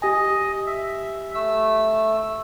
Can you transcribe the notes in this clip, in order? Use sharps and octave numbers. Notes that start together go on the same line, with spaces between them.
G4 D#5 G#5
E5
A3 E6